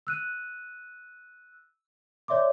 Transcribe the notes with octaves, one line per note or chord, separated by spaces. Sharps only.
E6 F#6 D#7
C#5 D5 E5 C6 D6